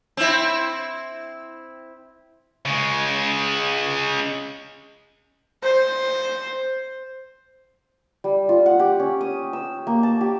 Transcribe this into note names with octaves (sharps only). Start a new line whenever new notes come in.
C4 E4
C#3 G#3
C5
G3
F4
F#5
G4
C#4
D#6
E6
A#3
A5
G4